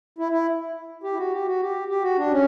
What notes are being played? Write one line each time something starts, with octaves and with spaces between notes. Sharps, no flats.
E4
E4
G4
E4
F#4
G4
F#4
G4
G4
F#4
D4
C#4